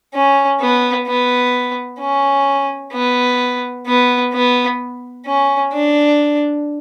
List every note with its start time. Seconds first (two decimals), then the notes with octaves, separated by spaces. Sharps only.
0.14 C#4
0.60 B3
1.07 B3
2.00 C#4
2.93 B3
3.87 B3
4.33 B3
5.26 C#4
5.73 D4